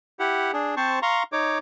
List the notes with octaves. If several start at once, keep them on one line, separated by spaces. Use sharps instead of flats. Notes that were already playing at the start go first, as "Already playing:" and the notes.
E4 G4 F#5
D4 G#4
C4 C5 A5 C#6
F5 A#5 C6 C#6
D#4 C#5 D6